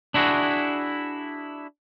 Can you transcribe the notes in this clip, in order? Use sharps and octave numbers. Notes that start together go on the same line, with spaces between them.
D4 E4 F#4 G#4